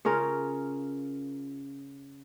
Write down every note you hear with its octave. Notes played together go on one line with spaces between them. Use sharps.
C#3 C#4 F4 A#4